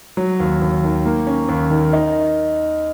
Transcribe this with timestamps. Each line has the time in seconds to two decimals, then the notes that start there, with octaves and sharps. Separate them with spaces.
0.17 F#3
0.40 D#2
0.62 D#2
0.84 D#3
1.06 A#3
1.27 C#4
1.49 D#2
1.70 D#3
1.93 D#4